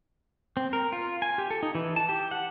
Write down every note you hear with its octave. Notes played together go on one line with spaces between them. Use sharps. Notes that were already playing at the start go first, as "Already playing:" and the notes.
C4
A#4
F4
G#5
G4
A4
D#4
E3
A5
G4
F#5